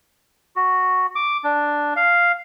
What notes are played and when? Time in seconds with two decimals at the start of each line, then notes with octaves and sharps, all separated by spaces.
0.56 F#4
1.15 D6
1.44 D4
1.96 F5